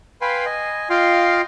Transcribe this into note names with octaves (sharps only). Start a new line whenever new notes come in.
B4 F5 G5 G#5 B5 C6
D#5 G#5
F4 D#5 F5 G5 C6